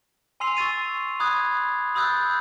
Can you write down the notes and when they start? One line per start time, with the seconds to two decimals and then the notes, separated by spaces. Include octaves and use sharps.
0.40 G#5 C6 E6 C7 F7
0.57 C#6 E6 A6 D#7
1.20 B5 D#6 F#6 G#6
1.95 B5 D#6 E6 F#6 G6 A6